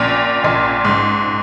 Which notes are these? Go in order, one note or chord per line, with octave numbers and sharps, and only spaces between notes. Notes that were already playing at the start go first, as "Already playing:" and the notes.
Already playing: A#1 A#2
A#1 A#2
G#2